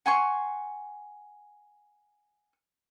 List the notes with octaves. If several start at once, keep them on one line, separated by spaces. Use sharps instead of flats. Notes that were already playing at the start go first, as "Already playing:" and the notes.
F#5 G#5 C6 C#6